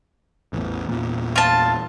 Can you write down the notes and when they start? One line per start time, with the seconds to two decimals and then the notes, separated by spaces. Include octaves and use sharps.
0.53 A1 E2
0.89 E2 A#2
1.36 F4 A5